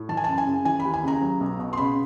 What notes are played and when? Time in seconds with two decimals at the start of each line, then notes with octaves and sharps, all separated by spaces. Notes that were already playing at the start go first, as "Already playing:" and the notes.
Already playing: A2
0.09 E3 A5
0.17 G#5
0.24 F#2 A5
0.38 G#5
0.46 C#3
0.65 E3 G#5
0.80 B5
0.85 D#2
0.94 G#5
1.03 C#3 A#5
1.22 F#3
1.40 B1
1.59 B2
1.73 C6
1.78 C#3 B5